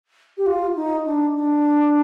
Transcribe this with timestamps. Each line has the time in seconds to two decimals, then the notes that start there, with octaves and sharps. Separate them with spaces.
0.37 G4
0.46 F4
0.76 D#4
1.05 D4
1.35 D4